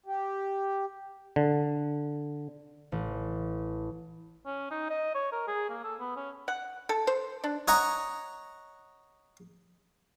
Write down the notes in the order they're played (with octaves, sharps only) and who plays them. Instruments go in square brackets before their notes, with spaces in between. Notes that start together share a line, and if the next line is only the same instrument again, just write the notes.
[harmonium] G4
[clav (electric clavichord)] D3
[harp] A1
[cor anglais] C#4
D#4
D#5
C#5
A#4
G#4
A#3
A4
B3
C#4
[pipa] F#5
A4
C5
D4
[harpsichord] C#5 D#5 F#5 A#5 C#6